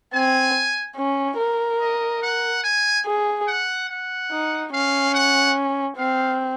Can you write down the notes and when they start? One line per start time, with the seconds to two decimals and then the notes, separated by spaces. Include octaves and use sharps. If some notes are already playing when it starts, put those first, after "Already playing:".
0.13 C4 G#5
0.96 C#4
1.38 A#4
1.80 D#5
2.22 F#5
2.64 G#5
3.06 G#4
3.48 F#5
3.90 F#5
4.31 D#4
4.73 C#4 F5
5.14 F#5
5.97 C4 F5